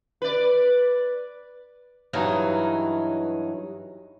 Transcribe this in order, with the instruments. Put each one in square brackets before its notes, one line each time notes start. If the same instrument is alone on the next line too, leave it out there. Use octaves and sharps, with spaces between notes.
[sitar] B4 D5
[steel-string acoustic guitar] G2 E3 F#3 D#4